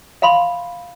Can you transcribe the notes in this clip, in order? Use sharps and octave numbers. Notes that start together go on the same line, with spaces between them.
E5 F5 B5 C6